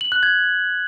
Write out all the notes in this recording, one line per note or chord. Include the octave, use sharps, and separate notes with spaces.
F#7
F#6
G#6